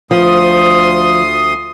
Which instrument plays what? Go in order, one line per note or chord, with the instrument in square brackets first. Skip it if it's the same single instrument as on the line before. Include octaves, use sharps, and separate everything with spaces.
[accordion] D2 C6 D#6 [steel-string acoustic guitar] F3